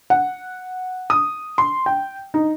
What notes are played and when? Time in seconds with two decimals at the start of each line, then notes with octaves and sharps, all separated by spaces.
0.10 F#5
1.10 D#6
1.58 C6
1.86 G5
2.34 D#4